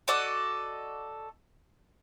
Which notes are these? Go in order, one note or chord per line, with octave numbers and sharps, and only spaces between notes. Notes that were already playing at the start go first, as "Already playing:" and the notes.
F#4 A4 D5 D#5